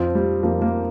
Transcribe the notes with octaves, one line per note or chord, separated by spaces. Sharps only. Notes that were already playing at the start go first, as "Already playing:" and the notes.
Already playing: F2 F3 C4 F4
G3
F2 F3 A#3
A#3